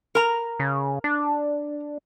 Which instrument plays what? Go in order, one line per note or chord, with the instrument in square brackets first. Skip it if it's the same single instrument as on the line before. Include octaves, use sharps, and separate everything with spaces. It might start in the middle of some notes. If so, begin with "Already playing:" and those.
[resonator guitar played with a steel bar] A#4 A#5
[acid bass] C#3
D4